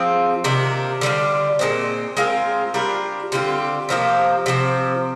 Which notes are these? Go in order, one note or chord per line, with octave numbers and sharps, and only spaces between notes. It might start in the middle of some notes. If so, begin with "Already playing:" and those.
Already playing: F3 C4 F4 G#4
C3 D#3 A#3 D4
D3 G3 D4 F4
A#2 G#3 C4
G#3 C4 F4 A#4
G3 D4 F4 A#4
D3 G3 C4 F4
C3 F3 A#3 D#4
C3 F3 C4